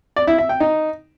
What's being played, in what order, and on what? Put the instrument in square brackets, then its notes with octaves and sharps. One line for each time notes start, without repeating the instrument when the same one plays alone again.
[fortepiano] D5
E4
E5
G5
D#4